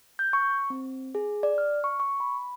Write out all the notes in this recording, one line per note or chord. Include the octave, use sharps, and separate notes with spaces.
G6
C#6
C4
G#4
D5
F6
C#6
C#6
B5